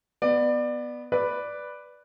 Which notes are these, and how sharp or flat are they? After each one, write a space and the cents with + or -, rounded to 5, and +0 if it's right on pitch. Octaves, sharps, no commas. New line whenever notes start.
B3 +0 D5 +25
B4 +0 D5 +0